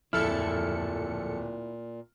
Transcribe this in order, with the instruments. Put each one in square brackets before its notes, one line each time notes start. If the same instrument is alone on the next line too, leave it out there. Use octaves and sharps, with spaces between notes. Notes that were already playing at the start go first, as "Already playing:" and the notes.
[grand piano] D1 F6 [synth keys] F2 A4 C#7 [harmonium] A#2 [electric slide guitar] E4